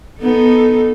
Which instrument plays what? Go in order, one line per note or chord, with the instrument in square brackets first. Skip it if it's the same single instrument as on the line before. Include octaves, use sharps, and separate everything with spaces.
[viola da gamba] B3 D#4 A4